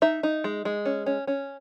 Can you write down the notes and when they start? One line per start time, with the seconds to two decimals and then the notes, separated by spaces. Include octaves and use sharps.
0.02 D#4 E5
0.23 D#4
0.44 G#3
0.65 G#3
0.86 C#4
1.06 C#4
1.27 C#4